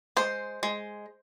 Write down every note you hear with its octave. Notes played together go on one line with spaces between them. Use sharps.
G#3 C5
G#3